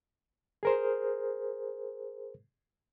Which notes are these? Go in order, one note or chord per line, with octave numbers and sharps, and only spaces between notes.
G#4 A#4 C5